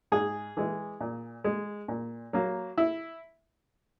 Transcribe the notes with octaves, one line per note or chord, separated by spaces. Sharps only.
G#2 G#4
E3 G#3
A#2
G#3
A#2
F#3 A#3
E4